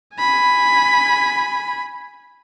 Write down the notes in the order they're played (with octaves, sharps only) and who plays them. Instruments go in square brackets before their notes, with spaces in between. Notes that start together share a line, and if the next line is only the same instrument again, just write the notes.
[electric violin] G#5 B5